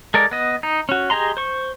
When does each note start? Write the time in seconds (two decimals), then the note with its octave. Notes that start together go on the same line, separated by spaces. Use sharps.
0.14 G#3 A4 A#4 D5
0.31 B3 D#5
0.63 D#4
0.89 C#4 F#4
1.10 G4 G#4 D#5 A#5 C6
1.37 C5 C#6